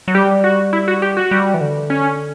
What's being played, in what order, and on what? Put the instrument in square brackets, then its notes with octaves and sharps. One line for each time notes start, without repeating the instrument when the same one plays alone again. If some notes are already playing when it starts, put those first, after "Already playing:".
[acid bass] F#3
[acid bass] G3 [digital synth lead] G4
[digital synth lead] F#4
E4
F#4
G4
F#4
[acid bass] G3
E3
D3
[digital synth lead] C#4